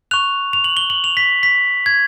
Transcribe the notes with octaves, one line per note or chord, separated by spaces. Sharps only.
C#6 F#6 F7
F7
F#7
G7
F#7
F7
B6
B6
G#6